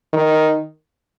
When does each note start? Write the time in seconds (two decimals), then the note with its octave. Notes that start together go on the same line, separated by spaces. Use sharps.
0.13 D#3